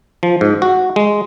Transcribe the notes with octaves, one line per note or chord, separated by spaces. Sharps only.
F3
G#2
F#4
G#3